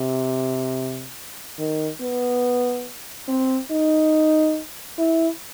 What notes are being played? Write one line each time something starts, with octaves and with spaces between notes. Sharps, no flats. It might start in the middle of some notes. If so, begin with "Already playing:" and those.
Already playing: C3
D#3
B3
C4
D#4
E4